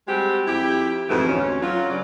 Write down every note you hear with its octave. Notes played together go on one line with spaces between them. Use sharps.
G3 G#3 C4 F#4 G4
F2 E4 G4
F2 G#2 B2 E3 A3
D2 C#4
F#3 F4
G2 C#3 D5